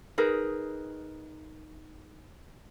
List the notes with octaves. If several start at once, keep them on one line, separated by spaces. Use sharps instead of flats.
D#4 G#4 A#4 B4